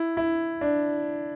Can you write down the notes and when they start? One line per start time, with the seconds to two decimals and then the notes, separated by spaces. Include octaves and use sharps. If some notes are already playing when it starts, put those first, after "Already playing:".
Already playing: E4
0.17 E4
0.61 D4